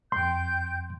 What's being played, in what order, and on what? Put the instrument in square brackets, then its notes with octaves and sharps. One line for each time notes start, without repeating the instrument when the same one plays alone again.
[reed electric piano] F2 C6 [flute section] G5 G6